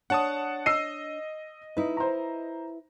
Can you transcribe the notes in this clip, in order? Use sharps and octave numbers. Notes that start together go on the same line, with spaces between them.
D4 C#5 F#5 A5 D#6
D#5 E6 C7 D#7
D#4 E4 B4
C5 A#5